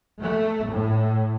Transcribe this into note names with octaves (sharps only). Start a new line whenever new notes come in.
A3
A2